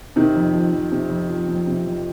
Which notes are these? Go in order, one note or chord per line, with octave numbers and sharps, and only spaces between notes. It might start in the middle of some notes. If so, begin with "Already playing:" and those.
C3 D#3
F2
F3
F2
C3
F2
F3
F2
C3
F2